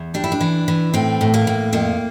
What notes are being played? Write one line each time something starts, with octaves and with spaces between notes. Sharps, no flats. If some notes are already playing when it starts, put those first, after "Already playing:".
Already playing: E2
G3 D4
E4
D4
E3
E3
A2 C4
A2
A#3
A2
F2 A#3